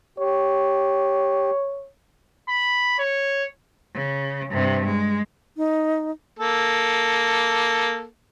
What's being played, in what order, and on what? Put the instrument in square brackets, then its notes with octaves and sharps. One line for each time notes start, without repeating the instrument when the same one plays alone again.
[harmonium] G4 [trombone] C#5
[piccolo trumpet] B5
C#5
[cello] C#3
G2 C3
G#3
[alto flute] D#4
[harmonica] A#3 A4